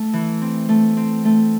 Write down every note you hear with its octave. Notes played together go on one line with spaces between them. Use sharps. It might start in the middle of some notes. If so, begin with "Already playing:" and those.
Already playing: A3
E3
C4
A3
C4
A3